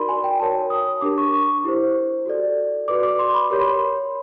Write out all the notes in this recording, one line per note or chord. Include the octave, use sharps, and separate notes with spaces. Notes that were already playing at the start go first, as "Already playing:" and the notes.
Already playing: D#4 F#4 A#4 D5 B5 C6
G#5
G5
F#4 A#4 C#5 A5
D#6
D4 G4 A#4 D6
C#6
C#6
E4 G4 C5
F#4 A4 D5
F#4 B4 D5 D6
D6
C6
B5
G4 A#4 C#5 C6
B5
C6